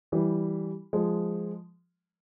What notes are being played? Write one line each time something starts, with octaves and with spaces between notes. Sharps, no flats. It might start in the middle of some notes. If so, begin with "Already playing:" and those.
E3 G3
F3 G#3